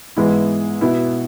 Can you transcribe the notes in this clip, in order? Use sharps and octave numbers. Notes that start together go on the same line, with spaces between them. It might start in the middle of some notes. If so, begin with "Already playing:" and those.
G#2 E3 G#3 B3 E4
B2 B3 E4